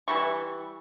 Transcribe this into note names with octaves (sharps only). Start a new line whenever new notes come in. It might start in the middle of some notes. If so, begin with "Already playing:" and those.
E3 G3 C#6